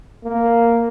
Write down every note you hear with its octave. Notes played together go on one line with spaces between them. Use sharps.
A#3